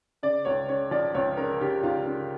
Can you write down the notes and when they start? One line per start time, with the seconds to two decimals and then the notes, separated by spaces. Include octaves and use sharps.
0.23 C#3 D5
0.45 C#2 C#5
0.69 C#3 C#5
0.91 F3 D5
1.14 C#2 C#5
1.37 C#3 A#4
1.61 C#3 G4
1.83 C#2 F4
2.07 C#3